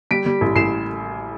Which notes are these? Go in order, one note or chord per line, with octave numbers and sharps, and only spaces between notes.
G3 B6 D7
G3
A1
A1 C7 E7